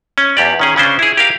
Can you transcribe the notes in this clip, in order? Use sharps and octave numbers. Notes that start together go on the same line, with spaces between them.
C#4
E2 G4 D5
D#3 C#4 G#4
C#3 C#4 D4 C5
E4 G#4
G4 A#4 F5